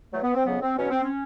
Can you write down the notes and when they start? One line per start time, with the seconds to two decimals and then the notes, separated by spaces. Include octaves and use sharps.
0.12 E2 B2 F#3 A3
0.23 B3
0.34 C4
0.45 F2 C#3 F#3 B3
0.61 C4
0.77 E2 B2 F#3 C#4
0.90 C4
1.03 C#4